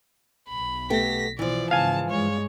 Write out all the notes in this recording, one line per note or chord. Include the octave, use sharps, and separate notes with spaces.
B1 B5
A3 B3 G4 A#6 B6
B2 E3 F3 D5
G#2 C#3 F5 G#5 A5
G2 G#3 C#5